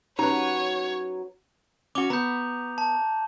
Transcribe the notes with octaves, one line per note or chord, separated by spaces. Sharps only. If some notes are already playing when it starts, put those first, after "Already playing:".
F#3 C#4 D#4 G4 B4 C#5 A#5
C#4 F#4 D6 F7 G7
B3 A#5 G6
A5